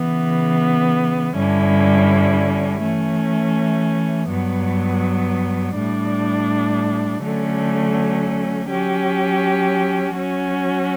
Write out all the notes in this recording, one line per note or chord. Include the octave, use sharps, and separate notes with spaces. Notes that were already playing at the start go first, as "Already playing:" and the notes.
Already playing: C#3 E3 B3
G2 D3 G3 C#4 E4
E3 A3 C#4
G2 F#3 B3
A2 G3 D4
D3 F#3 A3 C#4
F#3 C#4 G4
F#3 C#4 F#4